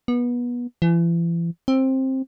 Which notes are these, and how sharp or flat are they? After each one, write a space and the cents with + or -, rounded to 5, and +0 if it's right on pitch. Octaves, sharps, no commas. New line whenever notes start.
B3 -25
E3 +40
C4 +15